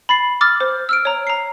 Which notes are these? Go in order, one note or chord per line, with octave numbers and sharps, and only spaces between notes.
B5 A6 C7
D6 E6 F6 A6
C5
E6 F6 D7
C#5 A#5
A#5 C7